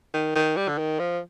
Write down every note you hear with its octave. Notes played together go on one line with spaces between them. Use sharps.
D#3
D#3
G3
D3
D#3
F3